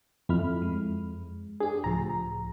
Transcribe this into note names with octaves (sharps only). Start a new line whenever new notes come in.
F2 E4 B5 F6
F#2 G#3
D4 G4 G#4
C#2 A2 F3 A#5